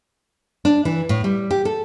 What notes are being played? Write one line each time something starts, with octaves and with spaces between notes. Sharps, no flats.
D4
E3
A2
G3
G4
A4